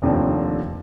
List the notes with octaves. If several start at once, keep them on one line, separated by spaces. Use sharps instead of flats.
F1 D#2 D3 F3 C4